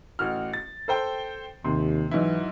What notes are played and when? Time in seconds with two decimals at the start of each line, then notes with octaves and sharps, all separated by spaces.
0.19 A1 F#4 F6
0.53 A6
0.88 A4 C5 G5
1.64 D#2 C3 C6
2.11 G#2 E3 F#3 E4